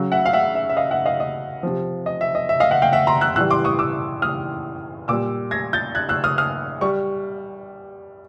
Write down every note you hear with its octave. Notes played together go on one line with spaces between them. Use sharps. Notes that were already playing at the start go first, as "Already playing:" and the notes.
Already playing: C#3 F#3
E5 F#5
F5
E5 F#5
E5
E5
D#5 F5
E5 F#5
D#5 F5
D#5
C3 F3
D#5
E5
D#5
E5
D#5 F5
E5 F#5
F5 G5
E5 F#5
A#5 C6
E6 F#6
A2 E3 G3 E6 F#6
C6 D6
C#6 D#6
D6 E6
D#6 F6
A#2 G3 D6 E6
G#6 A#6
G6 A6
F#6 G#6
E6 F#6
D#6 F6
D#6 F6
G3 C#6